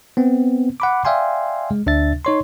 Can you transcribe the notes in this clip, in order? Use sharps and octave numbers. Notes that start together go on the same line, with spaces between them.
B3 C4
F#5 B5 D6
D5 E5 F5 G5 G#5 C6
G#3
D2 D4 E5 A6
D#4 C#5 C6